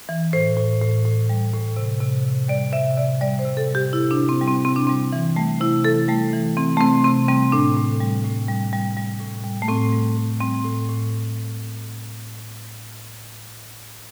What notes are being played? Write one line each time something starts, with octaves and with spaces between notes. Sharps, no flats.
E3
A2 C5
A2
A2
A2
G3
A2
C3
C3
C3
G3 D5
C3 E5
C3 D5
G3 D5
C5
C3
A4
G3
G4
C3 E4
D4
C3
C4
G3
C4
C3 C4
D4
G3 C4
E3
G3 A3
C3 E4
E3 A4
G3 A3
E3
E3 C4
A3
C3 C4
C3 C4
G3 C4
A2 D4
A2
G3
A2
G3
G3
G3
A2
G3
A3
A2 C4
G3
A2
G3 C4
A2
A2